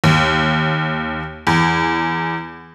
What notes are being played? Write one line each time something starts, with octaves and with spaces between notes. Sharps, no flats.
D#2
E2